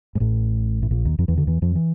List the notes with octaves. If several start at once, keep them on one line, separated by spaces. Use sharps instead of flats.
G#2
A1 A2
A2
A#1 A#2
D#2 D#3
F2 F3
E2 E3
D2 D3
E2 E3
F2 F3
E3